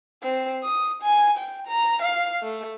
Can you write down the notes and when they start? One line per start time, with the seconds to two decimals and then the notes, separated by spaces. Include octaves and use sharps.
0.23 C4
0.64 D#6
1.02 G#5
1.38 G5
1.67 A#5
2.03 F5
2.43 A3